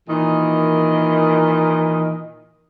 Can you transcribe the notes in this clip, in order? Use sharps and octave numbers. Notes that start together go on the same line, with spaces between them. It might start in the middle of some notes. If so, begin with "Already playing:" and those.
A#2 D#3 E3 D#5